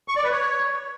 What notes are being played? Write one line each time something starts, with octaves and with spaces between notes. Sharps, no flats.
C#6
D5
B4
C#5